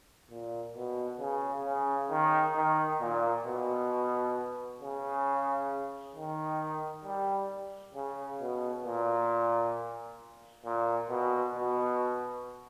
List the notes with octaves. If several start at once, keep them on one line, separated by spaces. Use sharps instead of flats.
A#2
B2
C#3
C#3
D#3
D#3
A#2
B2
C#3
D#3
G3
C#3
B2
A#2
A#2
B2
B2